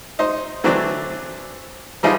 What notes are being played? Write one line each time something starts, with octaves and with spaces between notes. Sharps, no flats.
D#4 C5
D3 E3 F#3 A3 C4 D4
E3 F3 G3 G#3 D#4 F4